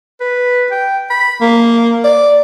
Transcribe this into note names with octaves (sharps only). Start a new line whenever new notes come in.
B4
G5
B5
A#3
D5